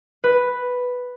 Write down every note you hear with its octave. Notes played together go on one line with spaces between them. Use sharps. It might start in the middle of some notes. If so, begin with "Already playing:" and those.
B4